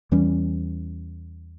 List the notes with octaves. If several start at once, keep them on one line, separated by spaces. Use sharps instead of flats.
E2 E3 G3 C#4